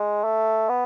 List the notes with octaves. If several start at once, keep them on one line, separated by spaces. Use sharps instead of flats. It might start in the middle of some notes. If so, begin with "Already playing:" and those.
Already playing: G#3
A3
B3